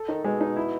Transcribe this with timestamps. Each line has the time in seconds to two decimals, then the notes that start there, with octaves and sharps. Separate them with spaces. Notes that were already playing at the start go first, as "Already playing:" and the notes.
Already playing: A4
0.08 D#3 D#4
0.24 B2 G#3
0.41 D#4
0.56 E4